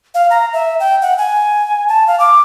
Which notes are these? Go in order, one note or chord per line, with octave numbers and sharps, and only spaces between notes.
F5
A#5
E5
G5
F#5
G#5
A5
F5
D6